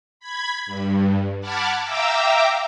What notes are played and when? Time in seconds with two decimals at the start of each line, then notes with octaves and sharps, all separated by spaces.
0.20 B5 G#6
0.66 G2
1.41 F#5 A5 B5 D6 F6 G#6
1.82 E5 F5 G5 A#5 D6 E6